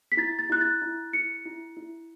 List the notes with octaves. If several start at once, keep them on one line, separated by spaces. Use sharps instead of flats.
B6
E4 A6
A6
E4 F#6
A6
E4
E4 C#7
E4
E4